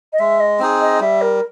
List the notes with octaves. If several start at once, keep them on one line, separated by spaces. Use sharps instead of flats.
D#5
G#3 E5
D#5
C4 D#4 G#4
D#5
G3 E5
A#4